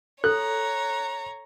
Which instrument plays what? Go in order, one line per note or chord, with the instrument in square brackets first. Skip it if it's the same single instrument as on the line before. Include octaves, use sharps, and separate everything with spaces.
[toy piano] A4 [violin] C#5 A#5 [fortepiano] F#6